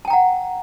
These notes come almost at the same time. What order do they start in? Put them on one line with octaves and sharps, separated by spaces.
A5 G5 A#5 F#5